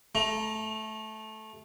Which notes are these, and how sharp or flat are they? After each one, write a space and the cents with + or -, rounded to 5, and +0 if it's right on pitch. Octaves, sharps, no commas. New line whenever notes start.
A3 -15 A#5 +15